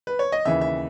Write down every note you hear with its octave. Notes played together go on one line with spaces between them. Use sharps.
B4
C#5
D#5
D#2 C#3 E3 E5
E5